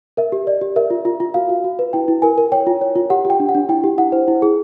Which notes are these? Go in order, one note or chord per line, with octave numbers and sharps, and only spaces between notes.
A#4 E5
G4
D5 D#5
G4
A#4 E5
F4
F4
F4
F#4 F5
F#4
F#4
B4
E4 G5
E4
A#4 G#5
A#4
C#5 G5
F4
C#5
F4
G4 F#5
G4
G5
D4
F#5
D4
E4 G5
G4
E4 F#5
C5
E4
G#4